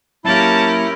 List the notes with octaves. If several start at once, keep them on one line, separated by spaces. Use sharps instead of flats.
F#3 A#3 C#4 E4 G4 A#4 A5